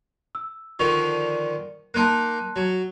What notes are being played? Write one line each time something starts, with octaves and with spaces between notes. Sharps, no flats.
E6
D3 D#3 F3 C#6
A#3 D#4 A5 C6 F#6
F#3